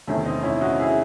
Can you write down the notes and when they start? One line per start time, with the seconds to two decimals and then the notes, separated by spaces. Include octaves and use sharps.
0.08 E2 C3 D#3 A3 C#4
0.25 C4 D#4
0.43 C#4 E4
0.61 D#4 F#4
0.79 E4 G#4